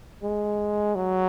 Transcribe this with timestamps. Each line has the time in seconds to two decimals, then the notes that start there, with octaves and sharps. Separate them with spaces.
0.23 G#3
0.96 F#3